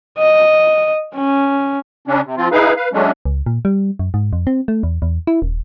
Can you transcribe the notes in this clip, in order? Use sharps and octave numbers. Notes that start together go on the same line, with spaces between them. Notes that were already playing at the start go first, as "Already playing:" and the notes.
D#5
C#4
C#3 C#4 D4
C3
F3 C4 F4
D#4 E4 G#4 B4 F5
B4 F5
F#3 G#3 A3 C#4 D4
C#2
A#2
G3
F#2
G#2
F2
C4
A3
E2
E2
E4
D#1